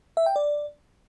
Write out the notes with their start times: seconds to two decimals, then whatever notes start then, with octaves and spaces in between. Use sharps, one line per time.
0.17 E5
0.26 G5
0.36 D5